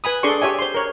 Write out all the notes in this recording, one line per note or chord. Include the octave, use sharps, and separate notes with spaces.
B4 G#5 B5 D#6
D4 G#4 A4 D5 C6 C#6
G4 C#5 E5 G#5
C5 C6
A#4 C#5